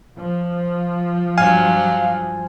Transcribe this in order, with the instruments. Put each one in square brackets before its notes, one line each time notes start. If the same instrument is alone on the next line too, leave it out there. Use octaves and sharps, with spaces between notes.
[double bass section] F3
[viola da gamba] G2 F#3 [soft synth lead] F5 [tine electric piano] G#5